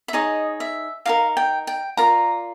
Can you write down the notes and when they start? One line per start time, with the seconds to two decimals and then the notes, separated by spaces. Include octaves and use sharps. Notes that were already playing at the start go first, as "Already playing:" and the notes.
0.08 E5
0.13 D#4 G#4 C#5 D#5
0.60 E5
1.05 D#4 G4 A#4 F5
1.37 G5
1.67 G5
1.97 F4 A#4 D5 A#5